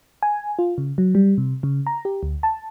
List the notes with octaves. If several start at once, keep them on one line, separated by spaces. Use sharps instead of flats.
G#5
F4
C#3
F#3
G3
C3
C#3
A#5
G4
D2
A5